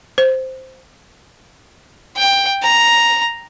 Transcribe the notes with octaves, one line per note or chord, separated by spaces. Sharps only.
C5
G5
A#5